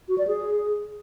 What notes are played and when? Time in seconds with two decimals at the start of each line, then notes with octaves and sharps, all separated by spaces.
0.09 F#4
0.18 D5
0.27 G#4